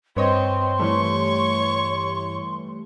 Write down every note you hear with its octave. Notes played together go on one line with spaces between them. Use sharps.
G2 C4 B4 C#5 D#5 C6
E3 G3 A3 C#5 C#6